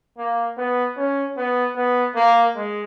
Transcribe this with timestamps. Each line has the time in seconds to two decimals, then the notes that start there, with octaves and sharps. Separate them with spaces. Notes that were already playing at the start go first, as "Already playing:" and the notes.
0.18 A#3
0.58 B3
0.97 C#4
1.37 B3
1.76 B3
2.15 A#3
2.56 G#3